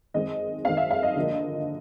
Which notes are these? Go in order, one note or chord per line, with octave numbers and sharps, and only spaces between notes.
D#3 G#3 C4 D#5
D#3 G#3 C4 F5
E5
F5
D#5
D3 F3 A#3